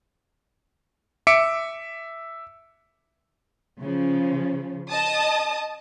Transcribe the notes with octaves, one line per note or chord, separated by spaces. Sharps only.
E5 D6 C#7 D7
C#3 F3
D#5 A5 D#6